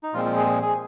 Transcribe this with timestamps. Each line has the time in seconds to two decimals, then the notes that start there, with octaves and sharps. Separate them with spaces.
0.03 D#4
0.13 A#2 F3 G#3 C4 F4
0.25 F4
0.36 G#4
0.46 G#4
0.62 G#4